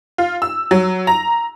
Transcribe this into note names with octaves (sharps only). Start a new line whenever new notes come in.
F4
E6
F#3
A#5